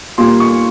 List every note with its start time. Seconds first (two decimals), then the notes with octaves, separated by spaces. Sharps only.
0.18 A#2 G3 A#3 C6
0.40 C#6